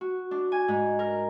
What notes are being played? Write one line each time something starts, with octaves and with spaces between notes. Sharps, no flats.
F#4
D4
G#5
G#2
A#4